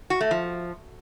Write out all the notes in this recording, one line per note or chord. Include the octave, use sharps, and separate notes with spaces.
F#4
A3
F3